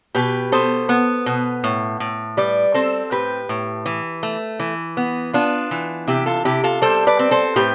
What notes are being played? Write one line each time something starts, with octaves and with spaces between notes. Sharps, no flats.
B2 G4 B4
B3 A4 C5
B3
B2
A2
A2
G3 B4 D5
C4 A4 C5
A2 G4 B4
A2
E3
A3
E3
B3
B3 D4 F4
E3
C3 E4 G4
F4 A4
C3 E4 G4
F4 A4
G3 A4 C5
B4 D5
C4
A4 C5
A2 G4 B4